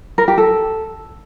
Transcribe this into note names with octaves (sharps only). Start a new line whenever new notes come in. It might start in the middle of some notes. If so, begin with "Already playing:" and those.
A#4
G4
A4